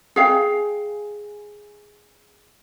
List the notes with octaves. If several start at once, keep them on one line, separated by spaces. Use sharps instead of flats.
G#4 F5 G5